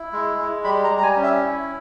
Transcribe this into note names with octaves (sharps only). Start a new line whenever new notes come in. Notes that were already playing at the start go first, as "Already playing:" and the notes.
Already playing: E4
G#3
G#3
G3 B5
A#5
G3
A#5
G#5
C#4
E5
E4